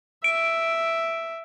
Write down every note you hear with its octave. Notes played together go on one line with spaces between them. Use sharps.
E5 D7